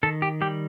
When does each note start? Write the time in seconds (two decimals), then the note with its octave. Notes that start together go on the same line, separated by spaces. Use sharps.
0.03 D#3 A4
0.22 G4
0.41 G3 G4